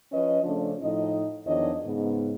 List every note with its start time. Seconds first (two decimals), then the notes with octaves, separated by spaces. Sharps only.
0.12 F3 C#4 B4 D#5
0.44 C#3 F3 A3 C#4 D4
0.82 A2 F3 D#4 D#5
1.46 E2 D#3 F3 D4 C#5 D#5
1.85 G#2 C#3 B3